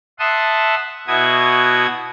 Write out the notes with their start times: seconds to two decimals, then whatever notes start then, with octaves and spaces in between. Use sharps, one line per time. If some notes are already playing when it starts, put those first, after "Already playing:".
0.19 E5 F#5 A5 C6 D#6
1.07 B2 E4 F#4 D#6 G#6